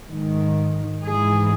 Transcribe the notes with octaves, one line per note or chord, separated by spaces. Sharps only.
G#2 D#3
G#2 E3 G#4